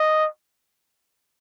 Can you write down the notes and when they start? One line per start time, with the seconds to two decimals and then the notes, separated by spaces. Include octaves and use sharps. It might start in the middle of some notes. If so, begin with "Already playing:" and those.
Already playing: D#5